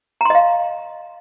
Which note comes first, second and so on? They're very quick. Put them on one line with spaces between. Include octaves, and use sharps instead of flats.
A#5 C6 D#5 F5